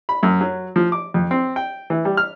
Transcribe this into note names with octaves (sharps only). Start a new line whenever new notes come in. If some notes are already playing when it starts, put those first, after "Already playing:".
B5
F#2
F#3
F3
D6
F2
C4
G5
E3
G3
F6